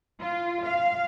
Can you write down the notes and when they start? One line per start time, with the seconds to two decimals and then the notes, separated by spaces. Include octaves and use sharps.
0.19 F4
0.65 F5